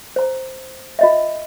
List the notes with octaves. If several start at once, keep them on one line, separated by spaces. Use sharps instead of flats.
C5 A#5
F4 D#5 E5